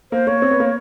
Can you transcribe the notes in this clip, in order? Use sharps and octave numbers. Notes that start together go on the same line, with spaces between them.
A#3 C5
A#3 C#5
C4
B3
A#3